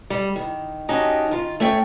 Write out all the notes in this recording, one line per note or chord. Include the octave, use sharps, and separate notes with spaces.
G3
D#3
C#4 D#4 F#4 G4 D#5 A5
D#3 F4
A3 C#4 C#5 G5